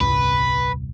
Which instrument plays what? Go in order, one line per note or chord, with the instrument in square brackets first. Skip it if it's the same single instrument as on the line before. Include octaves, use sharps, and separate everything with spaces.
[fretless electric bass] D#1 C2 G2 [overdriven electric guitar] B4